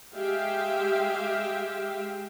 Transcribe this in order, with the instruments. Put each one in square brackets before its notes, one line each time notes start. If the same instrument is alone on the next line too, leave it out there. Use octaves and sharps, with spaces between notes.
[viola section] G#3 G4 E5 F5 G5